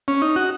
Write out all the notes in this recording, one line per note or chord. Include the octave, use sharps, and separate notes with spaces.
C#4
D#4
F#4